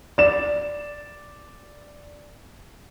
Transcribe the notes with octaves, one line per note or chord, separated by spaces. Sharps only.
D5 E7